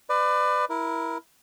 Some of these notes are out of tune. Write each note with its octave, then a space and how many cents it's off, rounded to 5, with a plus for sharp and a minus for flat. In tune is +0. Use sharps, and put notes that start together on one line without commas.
B4 +25 D5 +25
E4 +0 A#4 +20